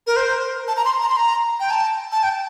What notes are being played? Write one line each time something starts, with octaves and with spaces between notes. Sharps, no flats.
A#4
C5
A5
A#5
C6
A#5
C6
A#5
G5
A5
A5
G5